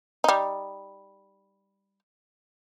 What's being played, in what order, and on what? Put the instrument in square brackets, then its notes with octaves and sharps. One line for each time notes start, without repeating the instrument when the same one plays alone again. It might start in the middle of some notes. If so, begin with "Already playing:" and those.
[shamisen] G3 D#4